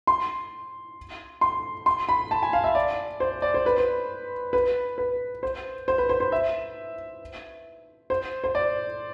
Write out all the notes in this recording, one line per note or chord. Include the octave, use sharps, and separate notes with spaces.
C6
C6
C6
B5
A5
G#5
F5
E5
D5
C5
D5
C5
B4
C5
B4
B4
C5
C5
B4
C5
C5
E5
C5
C5
D5